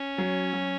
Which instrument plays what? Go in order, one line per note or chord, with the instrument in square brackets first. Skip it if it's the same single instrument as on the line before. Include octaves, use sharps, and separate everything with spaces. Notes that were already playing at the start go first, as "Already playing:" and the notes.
Already playing: [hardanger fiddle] C#4
[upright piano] F#3
F#3